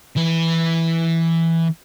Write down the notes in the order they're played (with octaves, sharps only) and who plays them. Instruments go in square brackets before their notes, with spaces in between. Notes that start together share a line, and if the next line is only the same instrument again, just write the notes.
[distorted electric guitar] E3 B4